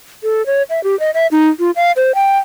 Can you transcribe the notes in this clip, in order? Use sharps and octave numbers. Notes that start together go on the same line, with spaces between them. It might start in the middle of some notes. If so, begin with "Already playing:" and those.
A4
C#5
E5
G4
D#5
E5
D#4
F4
F5
C5
G5